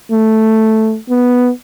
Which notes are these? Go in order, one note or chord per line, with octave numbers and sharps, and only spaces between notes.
A3
B3